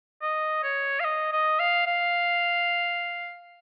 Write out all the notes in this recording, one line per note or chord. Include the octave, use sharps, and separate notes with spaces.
D#5
C#5
F5
D#5
D#5
F5
F5